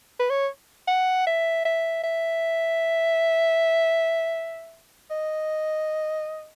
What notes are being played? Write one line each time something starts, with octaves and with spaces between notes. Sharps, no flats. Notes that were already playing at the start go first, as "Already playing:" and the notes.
B4
C#5
F#5
E5
E5
E5
D#5